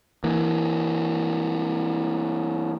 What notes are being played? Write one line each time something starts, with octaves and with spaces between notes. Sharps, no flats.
E3 A#3